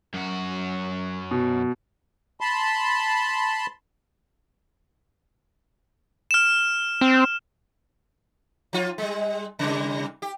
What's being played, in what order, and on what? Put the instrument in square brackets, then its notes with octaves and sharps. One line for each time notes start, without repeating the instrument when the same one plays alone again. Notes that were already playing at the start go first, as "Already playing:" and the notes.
[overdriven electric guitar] F#2 F#4
[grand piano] B2
[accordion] A5 B5 C6
[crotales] F6 E7
[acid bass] C4
[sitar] F3 F4
G3 G#3
C3 G3
G4